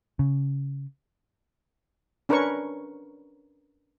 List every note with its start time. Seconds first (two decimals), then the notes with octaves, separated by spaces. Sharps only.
0.19 C#3
2.29 C#4 D4 A#4 B4 C#5 C#6